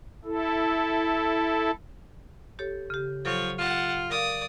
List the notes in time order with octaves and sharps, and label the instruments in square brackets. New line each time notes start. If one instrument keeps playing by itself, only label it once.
[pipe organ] E4 A4
[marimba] G4 A4 C#5
C#3 G4
[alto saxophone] F3 [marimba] F#3 A4 [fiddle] C#5
[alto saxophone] F4 [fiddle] F#5 A5
[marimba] A#4 F5 [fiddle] D5 D#6